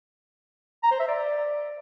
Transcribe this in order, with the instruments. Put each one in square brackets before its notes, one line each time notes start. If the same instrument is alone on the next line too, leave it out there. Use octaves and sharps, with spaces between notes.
[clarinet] A#5
C5
E5
D5